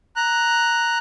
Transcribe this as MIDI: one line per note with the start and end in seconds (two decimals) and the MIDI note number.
0.16 0.98 82
0.16 0.98 90